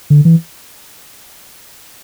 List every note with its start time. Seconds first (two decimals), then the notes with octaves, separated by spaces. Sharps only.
0.10 D3
0.25 E3